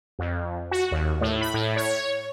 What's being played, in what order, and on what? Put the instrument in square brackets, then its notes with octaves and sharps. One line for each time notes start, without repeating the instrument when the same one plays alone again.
[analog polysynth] F2
F#4
D#2
A2
B5
A2
C#5